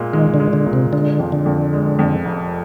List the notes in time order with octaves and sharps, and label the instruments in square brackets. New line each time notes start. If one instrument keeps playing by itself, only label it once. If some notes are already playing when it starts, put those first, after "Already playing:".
Already playing: [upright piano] A#2 G#3
[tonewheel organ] D#3 [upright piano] G#3
[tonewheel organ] D3
[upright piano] G#3
[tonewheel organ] D3
[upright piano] A#2
[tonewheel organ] C3
[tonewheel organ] D3 [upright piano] G#3
[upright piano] F2
[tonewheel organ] D3
[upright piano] F2
G#3
F2
F1